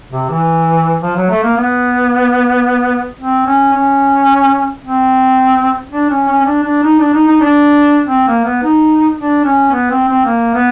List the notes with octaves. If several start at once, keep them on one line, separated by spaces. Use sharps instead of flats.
C3
E3
F3
F#3
A3
A#3
B3
C4
C#4
C#4
C4
D4
C#4
C#4
C#4
D4
D4
D#4
D4
D#4
D#4
D4
C4
A#3
B3
D#4
D4
C#4
B3
C4
C4
A#3
B3